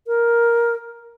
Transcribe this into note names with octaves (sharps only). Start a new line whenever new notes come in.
A#4